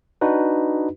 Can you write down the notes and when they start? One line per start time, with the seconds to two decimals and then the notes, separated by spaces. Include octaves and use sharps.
0.21 D4 D#4 F#4 B4